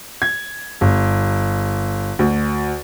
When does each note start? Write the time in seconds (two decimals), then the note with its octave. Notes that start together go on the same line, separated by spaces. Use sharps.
0.22 G#6
0.81 G1
2.19 D2